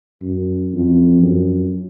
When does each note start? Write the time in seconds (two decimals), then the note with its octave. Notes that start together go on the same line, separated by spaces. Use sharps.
0.22 F#2
0.73 F2
1.22 F#2